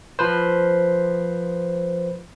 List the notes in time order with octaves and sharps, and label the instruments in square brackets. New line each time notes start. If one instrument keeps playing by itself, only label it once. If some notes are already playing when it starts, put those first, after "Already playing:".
[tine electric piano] F3 B4 C5